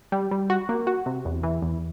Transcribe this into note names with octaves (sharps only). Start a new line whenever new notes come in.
G3
G3
F#4
A#3
F#4
C3
E2
E3
E2